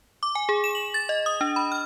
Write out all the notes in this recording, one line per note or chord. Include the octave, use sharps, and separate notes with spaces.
D6
G#5
G#4
E7
F#7
A6
D#5
D#6
D4
B5
F6